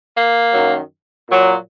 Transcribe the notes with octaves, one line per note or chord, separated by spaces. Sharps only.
A#3
F#2 D#3 F#3
A#2 F#3